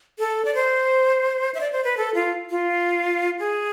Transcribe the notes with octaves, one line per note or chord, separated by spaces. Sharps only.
A4
D5
C5
E5
D5
C5
B4
A4
F4
F4
G#4